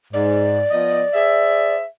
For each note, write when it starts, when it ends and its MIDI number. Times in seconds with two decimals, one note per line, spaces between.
0.14 0.61 44
0.14 1.75 74
0.71 1.04 53
0.71 1.04 59
0.71 1.04 75
1.14 1.84 68
1.14 1.84 72
1.14 1.84 76